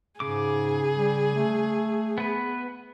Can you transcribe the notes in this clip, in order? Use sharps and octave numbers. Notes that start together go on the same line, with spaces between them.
G#2 C#3 G#4 D6
G3
A3
B3 B4